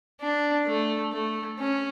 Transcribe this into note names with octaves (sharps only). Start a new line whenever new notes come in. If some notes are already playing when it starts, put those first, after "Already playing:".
D4
A3
A3
C#4